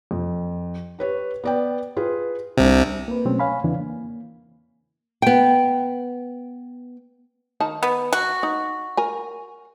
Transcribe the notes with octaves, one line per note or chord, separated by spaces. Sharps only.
F2
G4 B4 C#5
B3 D5 G5
F4 G#4 B4
C2 C3 C4 D4
A#3 B4
B2 F#3 A3 C4 C#4
C#5 F5 G#5 B5
E2 C#3 E3 C4 D4
A#3
B3 G5
D#3 D#4 A5
B3
F#4
D#4
A#4 G#5